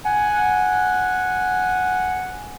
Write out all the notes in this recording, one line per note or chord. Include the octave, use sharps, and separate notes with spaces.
F#5 G#5